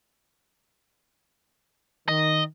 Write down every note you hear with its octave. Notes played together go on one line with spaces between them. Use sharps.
D#3 D#5